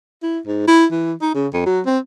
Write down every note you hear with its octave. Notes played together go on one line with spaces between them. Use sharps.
E4
G#2
E4
E3
D#4
C#3
F2
F#3
C4